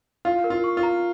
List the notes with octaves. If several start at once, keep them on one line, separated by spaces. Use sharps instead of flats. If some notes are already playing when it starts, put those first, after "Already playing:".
F4 F5
A#4
F4
C#6
F4
A#5